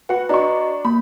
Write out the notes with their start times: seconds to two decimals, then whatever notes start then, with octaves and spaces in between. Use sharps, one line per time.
0.09 F#4 B4 F#5
0.29 D4 F#4 D#5 A#5 C#6
0.85 A#3 B5